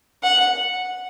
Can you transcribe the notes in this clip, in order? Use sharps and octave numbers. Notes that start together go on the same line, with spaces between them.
F#5